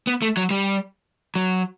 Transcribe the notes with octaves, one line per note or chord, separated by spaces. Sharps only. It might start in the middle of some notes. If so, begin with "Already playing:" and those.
B3
A3
F#3
G3
F#3